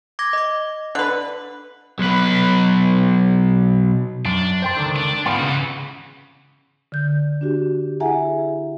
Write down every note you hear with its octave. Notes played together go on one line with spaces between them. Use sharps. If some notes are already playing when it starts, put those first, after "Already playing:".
D6 G#6 A#6
D#5 D6
D3 B4 F#6
B1 B4
F#2 D4
C5 G5 C6
C#2 D3 D#3
D4
G#2 C3 B3 F4
C#3 E3 F#4
D3 G6
D4 F#4 G4
E4 G#4 E5 F#5 G#5 A#5